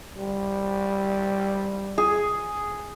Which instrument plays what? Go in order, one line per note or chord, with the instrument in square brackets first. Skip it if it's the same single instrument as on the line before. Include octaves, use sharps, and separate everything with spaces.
[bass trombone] G3
[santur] G#4